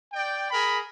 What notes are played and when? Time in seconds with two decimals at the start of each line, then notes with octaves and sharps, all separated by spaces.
0.13 D5 G5
0.51 G#4 A#4 B5